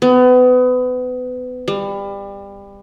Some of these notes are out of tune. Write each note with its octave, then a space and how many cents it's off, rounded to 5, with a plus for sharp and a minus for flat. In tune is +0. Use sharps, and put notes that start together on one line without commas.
B3 +30
G3 +25